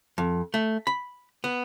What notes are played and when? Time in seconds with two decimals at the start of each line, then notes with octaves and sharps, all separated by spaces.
0.18 F2
0.54 A3
0.87 B5
1.44 B3